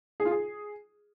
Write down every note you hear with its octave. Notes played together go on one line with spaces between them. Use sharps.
G#4
F4
G#4